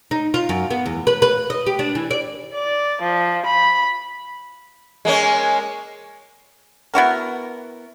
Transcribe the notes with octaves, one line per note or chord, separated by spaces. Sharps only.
D#4
F4
F#2
B3
E2
B4
B4
D#5
G4
D4
E3
D5
D5
F3
B5
G#3 A#3 C#4
B3 E4 F#4 A#4